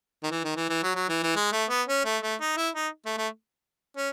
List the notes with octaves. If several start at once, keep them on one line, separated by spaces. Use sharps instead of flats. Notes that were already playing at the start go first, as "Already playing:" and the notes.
D#3
E3
D#3
E3
E3
F#3
F#3
E3
E3
G#3
A3
B3
C#4
A3
A3
D#4
E4
D#4
A3
A3
C#4